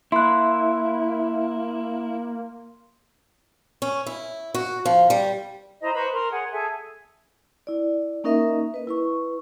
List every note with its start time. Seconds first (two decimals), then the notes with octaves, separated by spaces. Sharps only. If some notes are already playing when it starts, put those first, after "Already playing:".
0.12 A#3 E4 C6 F#6
3.82 C#4
4.06 E4
4.54 F#4
4.85 F3
5.10 G3
5.81 E4 C5 D#5 A#5
5.93 B4 C5 B5 C#6
6.12 A#4 C6
6.30 G#4 C#5 F#5
6.51 G#4 A4 E5
7.67 E4 D5
8.24 A#3 C#4 D#4 A#4 D#5 E5
8.74 B4 D#5
8.87 E4 B4 C#6